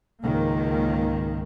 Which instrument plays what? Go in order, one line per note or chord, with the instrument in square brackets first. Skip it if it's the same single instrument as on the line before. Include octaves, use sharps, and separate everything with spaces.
[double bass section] C#2 G#2 D#3 A#3